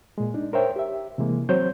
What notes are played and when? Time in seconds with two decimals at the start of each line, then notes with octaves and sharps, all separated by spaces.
0.18 A#2 G#3
0.34 D4 D#4
0.53 A#4 C5 C#5 E5 G5
0.76 G4 E5
1.18 C3 E3 G#3 A#3
1.49 F#3 C4 C5 C#5 G6